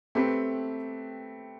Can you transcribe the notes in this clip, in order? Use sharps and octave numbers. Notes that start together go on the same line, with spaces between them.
A3 C4 G4 B4